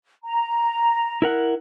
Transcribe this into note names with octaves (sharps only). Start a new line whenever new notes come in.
A#5
E4 A#4 F#5